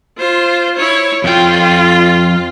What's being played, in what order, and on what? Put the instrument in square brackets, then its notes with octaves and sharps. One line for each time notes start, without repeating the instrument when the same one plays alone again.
[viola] F4 C5
E4 C#5
[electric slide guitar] F2 G5 [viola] F4